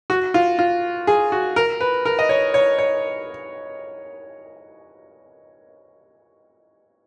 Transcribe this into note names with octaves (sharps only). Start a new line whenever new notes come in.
F#4
F4
F4
G#4
F#4
A#4
B4
A#4
D#5
C#5
C#5
C#5